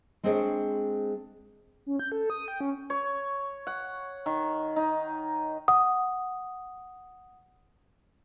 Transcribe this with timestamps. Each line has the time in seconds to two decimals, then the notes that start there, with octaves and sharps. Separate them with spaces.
0.23 G#3 C4 D4 G#4 C5 C#5
1.86 C#4
1.99 G6
2.12 A4
2.30 D#6
2.48 G5
2.60 C#4
2.90 C#5
3.67 F#5
4.26 D#3
4.76 D#4
5.68 F#5 D#6